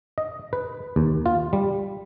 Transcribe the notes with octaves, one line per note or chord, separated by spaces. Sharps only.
D#5
B4
D#2
F4
G3